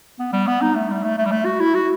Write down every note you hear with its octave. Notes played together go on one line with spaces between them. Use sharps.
B3
G3
B3
D#4
A3
G3
A3
A3
G3
A3
F#4
E4
F#4